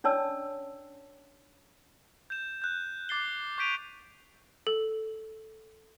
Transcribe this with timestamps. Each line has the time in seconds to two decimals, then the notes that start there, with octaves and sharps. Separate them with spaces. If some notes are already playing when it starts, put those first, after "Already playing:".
0.04 C#4 D4 C#5 D5 A5 E6
2.30 G6 E7
2.62 F#6 G6
3.09 D6 A6 C7 G7
3.58 C#6 G6 B6 D7 D#7 F7
4.67 A4